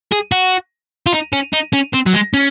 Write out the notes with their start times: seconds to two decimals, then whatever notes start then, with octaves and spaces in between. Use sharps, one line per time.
0.12 G#4
0.32 F#4
1.07 F4
1.13 D#4
1.33 C#4
1.53 D#4
1.73 C#4
1.93 C4
2.06 F#3
2.13 G#3
2.34 C#4